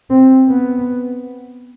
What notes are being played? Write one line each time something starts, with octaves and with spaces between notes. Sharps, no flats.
C4
B3